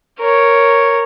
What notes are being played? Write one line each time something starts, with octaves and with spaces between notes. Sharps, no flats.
A#4 C#5